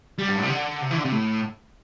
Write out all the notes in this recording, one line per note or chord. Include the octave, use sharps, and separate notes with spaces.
G3
G2
A2
C3
D3
C3
E3
D3
C3
A2